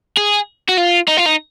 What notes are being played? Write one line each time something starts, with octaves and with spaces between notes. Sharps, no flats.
G#4
F#4
F4
D#4
F4
D#4